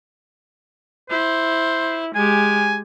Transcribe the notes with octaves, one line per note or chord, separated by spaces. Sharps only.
E4 C5
G#3 G4 G#5